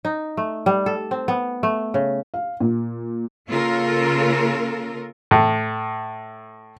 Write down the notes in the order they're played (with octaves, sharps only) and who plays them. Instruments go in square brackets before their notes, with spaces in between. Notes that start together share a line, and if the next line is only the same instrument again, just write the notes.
[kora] D#4
A3
G3
A4
C4
B3
A3
C#3
[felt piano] F5
A#2
[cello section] C#3 A#3 F4 A4 A#4
[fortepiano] A2